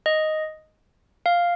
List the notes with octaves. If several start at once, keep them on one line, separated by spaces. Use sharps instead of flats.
D#5
F5